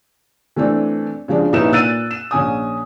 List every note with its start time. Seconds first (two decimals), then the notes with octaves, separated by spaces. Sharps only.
0.56 E3 A3 C4 D4
1.28 C#3 F3 G#3 D4
1.52 A#1 C#4 D#4 E4 B4 E7
1.72 A#2 A#3 E6 F#6 A6 D#7
2.11 E7
2.31 A#1 C#4 G#5 D#6